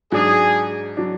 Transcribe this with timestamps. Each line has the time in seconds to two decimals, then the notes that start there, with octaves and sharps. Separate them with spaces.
0.12 G#2 F#3 D4 G#4
0.97 F#3 D4